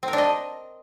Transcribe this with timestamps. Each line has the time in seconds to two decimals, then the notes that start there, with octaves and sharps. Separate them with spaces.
0.03 C4
0.08 A#4
0.13 D4
0.18 D#5